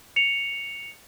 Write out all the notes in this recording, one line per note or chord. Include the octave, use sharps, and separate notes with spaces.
C#7 F7